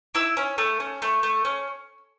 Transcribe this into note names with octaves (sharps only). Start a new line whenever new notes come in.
E4 E6
C#4
A3
C#4
A3
A3
C#4